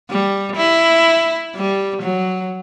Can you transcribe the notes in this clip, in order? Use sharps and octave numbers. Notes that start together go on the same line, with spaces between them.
G3
E4
G3
F#3